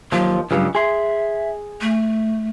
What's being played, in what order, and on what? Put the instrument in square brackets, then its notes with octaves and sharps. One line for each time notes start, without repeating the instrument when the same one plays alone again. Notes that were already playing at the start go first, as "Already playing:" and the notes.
[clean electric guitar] D#2 F3 [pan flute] F#3
[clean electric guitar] C#2 G2 C#3 [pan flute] F#3
[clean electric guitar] G#4 C6 [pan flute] E5
[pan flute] A3